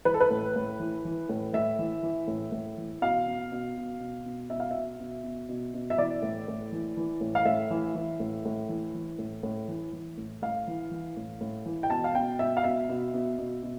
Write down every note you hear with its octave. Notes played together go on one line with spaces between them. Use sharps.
E3 B4
A4
B4
A2
A2
E3
E3
A2
A2 E5
E3
E3
A2
A2
E3
B2 F5
B2
B2
B2
B2
B2
B2 E5
F5
B2 E5
B2
B2
B2
B2
E5
E3 D5
A2
A2
E3
E3
A2
F5
A2 E5
E3
E3
A2
A2
E3
E3
A2
A2
E3
E3
A2
A2 F5
E3
E3
A2
A2
E3
G5
B2 A5
F5
B2 G5
B2 E5
F5
B2 E5
B2
B2
B2
B2